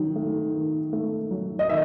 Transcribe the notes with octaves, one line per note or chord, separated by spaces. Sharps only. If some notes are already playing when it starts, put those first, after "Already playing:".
Already playing: D#3 F#3
A3
D#3
A3
F#3
D#5
D#3 E5